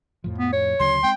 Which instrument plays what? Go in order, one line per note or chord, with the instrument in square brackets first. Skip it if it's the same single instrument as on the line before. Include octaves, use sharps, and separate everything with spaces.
[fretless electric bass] F2 A2 F3
[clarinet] B3
C#5
[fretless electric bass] D2 C#3 F#3 [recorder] C6
[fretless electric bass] G#3 C4 [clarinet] G5